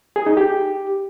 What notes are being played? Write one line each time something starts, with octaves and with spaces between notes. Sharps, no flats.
G#4
D#4
G4